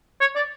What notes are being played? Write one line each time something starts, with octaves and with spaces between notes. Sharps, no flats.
C#5
D5